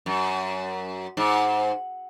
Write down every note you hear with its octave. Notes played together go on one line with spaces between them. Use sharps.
F#2
G#2